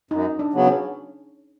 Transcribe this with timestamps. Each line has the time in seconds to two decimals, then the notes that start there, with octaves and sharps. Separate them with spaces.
0.11 F#2 D#4
0.39 D4
0.53 C#3 F#3 B3
0.67 C#4